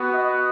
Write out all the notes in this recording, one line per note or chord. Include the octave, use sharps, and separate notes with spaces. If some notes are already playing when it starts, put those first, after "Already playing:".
Already playing: B3 F#4
D#5